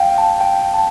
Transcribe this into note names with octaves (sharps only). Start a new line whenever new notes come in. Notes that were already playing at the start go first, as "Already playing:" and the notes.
Already playing: F5 G5
A5
G5
A5